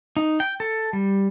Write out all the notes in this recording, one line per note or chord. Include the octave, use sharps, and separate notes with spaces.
D#4
G5
A4
G3